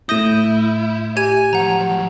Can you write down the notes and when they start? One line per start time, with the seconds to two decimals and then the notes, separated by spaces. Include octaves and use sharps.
0.09 A2 E4 D#6 G6 A#6 D#7
1.17 G4 G#5 G#6 D#7
1.53 F3 F#3 F#5 A#5